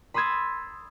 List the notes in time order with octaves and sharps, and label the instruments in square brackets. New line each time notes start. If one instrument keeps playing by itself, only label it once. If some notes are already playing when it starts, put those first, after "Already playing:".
[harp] B5 C6 D#6 E6 G#6 A6